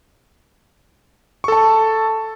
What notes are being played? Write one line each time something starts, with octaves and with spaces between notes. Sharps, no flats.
A4 A5 C#6